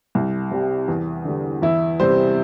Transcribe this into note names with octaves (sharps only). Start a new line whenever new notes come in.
C2
C3 G3
E2
D3 G3
E2 E4
C3 G3 C5